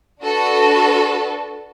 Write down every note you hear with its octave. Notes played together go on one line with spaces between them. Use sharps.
D4 F#4 A4 B4